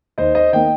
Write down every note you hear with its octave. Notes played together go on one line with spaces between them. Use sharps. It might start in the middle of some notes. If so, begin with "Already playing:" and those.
D#2 C5 D#5
C5 D#5
D#3 A#3 D#5 G5